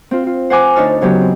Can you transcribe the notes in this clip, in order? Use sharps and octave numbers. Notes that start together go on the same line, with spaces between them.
C4 F4
F4
C5 F#5 G#5 D6
D2 D4 D#4 C#5 A5 F6
C#3 F#3 B3 G4
C4